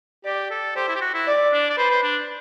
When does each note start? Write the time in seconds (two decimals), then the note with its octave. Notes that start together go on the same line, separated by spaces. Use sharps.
0.25 G4 D5
0.51 A4
0.76 G4 C5
0.89 E4
0.96 G4
1.01 F#4
1.15 E4
1.27 D5
1.53 D4
1.70 D5
1.77 B4 C5
1.91 C5
2.03 D4